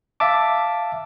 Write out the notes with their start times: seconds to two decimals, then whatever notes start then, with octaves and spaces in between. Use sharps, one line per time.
0.20 E5 F5 A5 D6